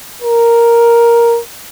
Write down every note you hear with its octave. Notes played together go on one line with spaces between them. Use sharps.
A#4